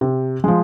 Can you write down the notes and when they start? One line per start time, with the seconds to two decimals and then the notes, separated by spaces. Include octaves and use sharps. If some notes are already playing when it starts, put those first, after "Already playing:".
0.01 C3
0.44 F3 G#3